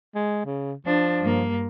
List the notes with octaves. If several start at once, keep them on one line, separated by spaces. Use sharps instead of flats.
G#3
C#3
F3 D4
G2 A#3